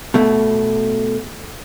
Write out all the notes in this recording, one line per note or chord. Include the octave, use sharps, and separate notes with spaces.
B2 A3